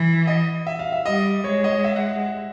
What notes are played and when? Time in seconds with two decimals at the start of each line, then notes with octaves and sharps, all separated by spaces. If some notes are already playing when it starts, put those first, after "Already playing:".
Already playing: E3
0.27 D#5
0.67 E5
0.79 F5
0.92 E5
1.06 G3 D#5
1.44 G#3 C#5
1.64 D#5
1.84 E5
1.96 F#5